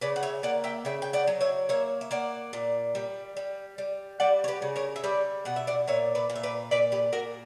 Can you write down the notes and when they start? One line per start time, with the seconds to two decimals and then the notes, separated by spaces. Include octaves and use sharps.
0.01 C#3 B4 D5
0.16 F#5
0.23 C#5 E5
0.43 A#3 D5 F#5
0.64 E5 G5
0.85 C#3 E5 G5
1.02 G5
1.13 D5 F#5
1.27 F#3
1.41 C#5 E5
1.69 A#3 C#5 E5
2.01 E5
2.11 A#3 D5 F#5
2.53 A#2
2.95 G3
3.37 G3
3.78 G3
4.20 G3 D5 F#5
4.44 C#5
4.48 G4 B4
4.62 C#3
4.76 A#4 C#5
4.96 E5
5.04 G3 B4 D5
5.45 B2 F#5
5.56 E5
5.67 D5 F#5
5.88 A#2 C#5 E5
6.15 B4 D5
6.30 A#2
6.36 E5
6.43 B4 D5
6.71 A#2 B4 D5
6.92 G4 B4
7.13 A#2 F#4 A#4